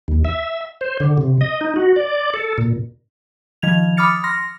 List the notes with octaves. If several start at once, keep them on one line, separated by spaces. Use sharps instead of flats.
D#2
E5
C5
D3
C3
D#5
D#4
F#4
D5
A4
A#2
D#3 F3 G#6 F7
B5 D6 D#6 F6 A6 C#7
C6 F6 A#6